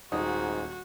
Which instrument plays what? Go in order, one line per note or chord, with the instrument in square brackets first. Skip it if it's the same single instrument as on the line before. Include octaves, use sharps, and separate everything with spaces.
[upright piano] D#1 [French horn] G#2 [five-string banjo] D#4 [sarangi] F#4